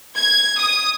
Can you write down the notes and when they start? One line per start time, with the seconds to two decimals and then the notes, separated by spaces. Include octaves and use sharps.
0.17 G#6
0.58 D#6